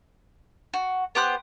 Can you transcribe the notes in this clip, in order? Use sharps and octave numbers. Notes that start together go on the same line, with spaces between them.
F#4
B3 G4 C5 F#6